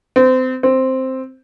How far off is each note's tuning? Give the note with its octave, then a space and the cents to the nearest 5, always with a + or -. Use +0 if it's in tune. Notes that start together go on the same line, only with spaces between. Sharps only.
C4 -30
C4 +0